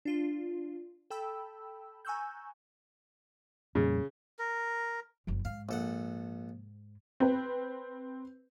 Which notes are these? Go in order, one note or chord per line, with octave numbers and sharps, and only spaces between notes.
D4 F4
A4 G5 A5 B5 E6
G#5 A#5 C#6 E6 F#6 G6
F2 A#2 C#3 G3
A#4
F#1 F3
G#2 F5
A#1 A4 F#5
C4 B4